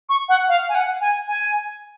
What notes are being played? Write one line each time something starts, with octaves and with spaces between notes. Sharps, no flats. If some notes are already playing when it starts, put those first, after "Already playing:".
C#6
F#5
F5
G#5
F#5
G#5
G#5